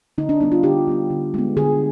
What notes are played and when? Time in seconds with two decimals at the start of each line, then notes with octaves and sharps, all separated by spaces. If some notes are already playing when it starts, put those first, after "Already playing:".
0.18 D3 D#4
0.29 D4
0.40 G3 B3 D4 D#4
0.52 F4
0.63 D3 G4
0.87 G3 B3 D4
1.10 D3
1.34 G#3 B3
1.57 D3 G#4